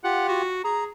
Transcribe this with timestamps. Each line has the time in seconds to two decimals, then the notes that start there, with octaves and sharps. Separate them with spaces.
0.04 F4 G4 F#5
0.28 F#4
0.64 G#4 A#5